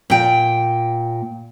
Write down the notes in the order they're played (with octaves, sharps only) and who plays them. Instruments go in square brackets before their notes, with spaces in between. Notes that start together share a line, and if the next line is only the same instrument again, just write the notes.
[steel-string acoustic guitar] A#2 G5